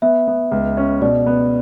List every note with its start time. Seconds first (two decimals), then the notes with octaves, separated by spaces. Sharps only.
0.02 B3 E5
0.27 B3
0.51 C#2
0.77 C#4
1.01 B2 D5
1.26 B3